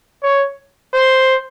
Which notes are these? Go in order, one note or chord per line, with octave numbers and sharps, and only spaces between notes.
C#5
C5